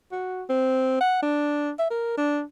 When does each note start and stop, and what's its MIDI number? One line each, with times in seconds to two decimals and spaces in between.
0.12 0.44 66
0.49 0.99 60
1.01 1.18 78
1.22 1.72 62
1.79 1.88 76
1.90 2.13 70
2.17 2.42 62